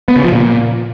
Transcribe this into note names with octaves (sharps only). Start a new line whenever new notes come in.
B3
C#3
F3
A#2